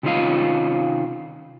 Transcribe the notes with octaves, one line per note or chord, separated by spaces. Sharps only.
C3 D#3 C#4 F4 D#5 F5